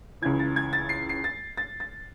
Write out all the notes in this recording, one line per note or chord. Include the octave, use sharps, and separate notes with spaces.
C#2 C#3 E3 G#6
A6
G#6
A6
C7
C7
A6
A6
A6